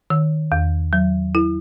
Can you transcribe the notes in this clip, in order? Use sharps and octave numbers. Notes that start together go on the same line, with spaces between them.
D#3
E2
F#3
E4